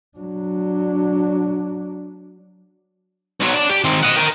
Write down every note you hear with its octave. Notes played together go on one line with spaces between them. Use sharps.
F#3 D4
B1 F#3
D5 A5
G4
D#3 C4
D#5 F#5
A#4 G5